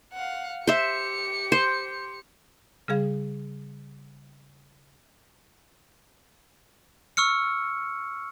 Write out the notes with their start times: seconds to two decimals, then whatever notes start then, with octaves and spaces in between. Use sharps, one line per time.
0.13 F5 F#5
0.67 G4 C5 E5 C#7
1.52 C5
2.88 C#3 G3 G#4 F5
7.17 C#6 E6 F6 C#7